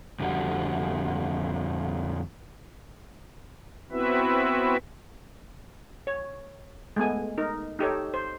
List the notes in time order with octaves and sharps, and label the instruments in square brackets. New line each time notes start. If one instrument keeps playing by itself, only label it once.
[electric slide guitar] F2 D3 G3 F#4
[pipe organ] B3 C4 E4 F#4 B4 E5
[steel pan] C#5
G#3 A3 B3 G#5
D#4 A#4
D#4 G4 A4 C#5
C5